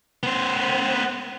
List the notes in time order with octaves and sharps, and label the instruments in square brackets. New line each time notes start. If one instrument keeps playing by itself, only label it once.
[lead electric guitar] B3 C5